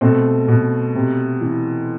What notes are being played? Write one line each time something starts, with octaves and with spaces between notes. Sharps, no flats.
B2 A3 C4
B2
C3
E3